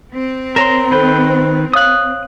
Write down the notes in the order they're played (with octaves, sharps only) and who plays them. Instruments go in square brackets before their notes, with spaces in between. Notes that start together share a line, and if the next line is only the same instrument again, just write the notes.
[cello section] C4
[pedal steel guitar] A#4 A#5 C6 [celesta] C#5 A#6 E7
[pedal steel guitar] D#3 B4 G5 [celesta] A4 C5 B5
[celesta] C5
[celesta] C#5 F5 F#7 [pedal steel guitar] D#6 F#6